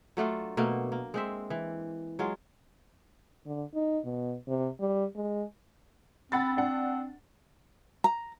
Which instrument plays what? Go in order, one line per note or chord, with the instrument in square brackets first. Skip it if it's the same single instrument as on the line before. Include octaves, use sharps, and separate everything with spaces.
[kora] F#3 A3 D4 F4
B2 A3 A#3
A#3
G#3 C4 E5
E3
F#3 G#3 F4
[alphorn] D3
D#4
B2
C3
G3
G#3
[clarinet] C4 [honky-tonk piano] F#5 B5 A6
[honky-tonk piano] D4 F#5
[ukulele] A#5